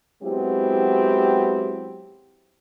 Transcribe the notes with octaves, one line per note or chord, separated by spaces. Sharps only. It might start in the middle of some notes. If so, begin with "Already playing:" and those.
F#3 G#3 B3 C4 E4 G4